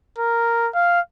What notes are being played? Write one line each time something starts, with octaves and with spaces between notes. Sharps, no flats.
A#4
F5